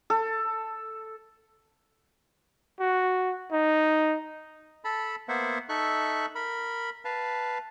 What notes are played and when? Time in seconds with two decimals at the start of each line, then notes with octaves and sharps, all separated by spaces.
0.10 A4
2.80 F#4
3.52 D#4
4.84 A4 A5 B5
5.28 A#3 B3 C5 E5 F#5
5.69 D#4 A4 E5 C#6 F#6
6.35 A#4 B5
7.05 B4 F5 A5